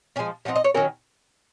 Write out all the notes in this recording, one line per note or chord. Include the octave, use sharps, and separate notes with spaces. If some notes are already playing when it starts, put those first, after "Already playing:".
F3 G#3 C#4 G#5
F3 C4 D#4 F#5
D#5
C#5
D#3 F#3 C#4 A#4